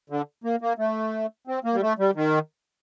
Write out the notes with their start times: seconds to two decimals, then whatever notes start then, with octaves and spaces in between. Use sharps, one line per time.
0.10 D3
0.44 A#3
0.61 A#3
0.78 A3
1.47 C4
1.64 A#3
1.73 G3
1.81 A3
1.99 G3
2.15 D#3